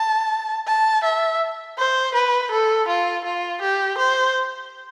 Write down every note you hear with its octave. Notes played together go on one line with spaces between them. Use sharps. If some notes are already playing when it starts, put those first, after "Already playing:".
Already playing: A5
A5
E5
C5
B4
A4
F4
F4
G4
C5